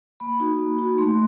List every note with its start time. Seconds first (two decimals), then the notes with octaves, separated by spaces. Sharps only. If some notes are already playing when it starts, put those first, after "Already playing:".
0.20 A#3 B5
0.40 D#4 F#4
0.59 A#3
0.78 D#4 F#4
0.98 A3 C6